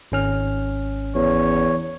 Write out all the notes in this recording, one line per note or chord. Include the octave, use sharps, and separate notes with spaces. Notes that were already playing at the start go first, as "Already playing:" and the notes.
G#1 C#4 F6
E2 C#5